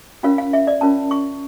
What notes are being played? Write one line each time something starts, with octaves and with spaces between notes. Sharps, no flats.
C#4 F4 A#4 C#5 F5
F5
E5
D5
C#4 F4 A#4 C#5 A5
C#6